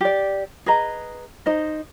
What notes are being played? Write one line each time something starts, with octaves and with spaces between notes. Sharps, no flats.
G4 D5
G#4 B4 D#5 A#5
D#4 C5 D#5